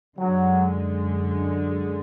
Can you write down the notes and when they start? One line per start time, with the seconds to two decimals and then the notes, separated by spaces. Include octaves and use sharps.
0.18 F#2 D3 F#3 G#3